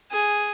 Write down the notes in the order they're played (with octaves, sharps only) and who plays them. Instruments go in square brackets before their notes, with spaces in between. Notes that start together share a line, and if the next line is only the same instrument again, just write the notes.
[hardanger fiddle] G#4